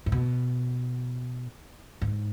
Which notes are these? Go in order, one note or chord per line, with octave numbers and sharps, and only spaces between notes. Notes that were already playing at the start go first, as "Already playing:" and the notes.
G#2
B2
G#2